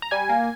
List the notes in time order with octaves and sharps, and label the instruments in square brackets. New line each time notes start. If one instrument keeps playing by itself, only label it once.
[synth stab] A#5
G3 G#5
A#3